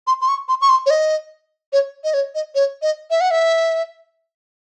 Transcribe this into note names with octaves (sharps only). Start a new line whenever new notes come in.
C6
C6
C#6
C6
C#6
C6
C#5
D#5
C#5
D#5
C#5
D#5
C#5
D#5
E5
F#5
E5